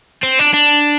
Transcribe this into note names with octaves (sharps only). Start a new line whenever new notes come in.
C4
D4
D4